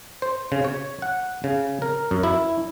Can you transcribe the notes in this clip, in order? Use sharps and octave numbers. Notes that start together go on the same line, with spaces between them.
C5
C#3
C#5
F#5
C#3
A#4
F#2
E4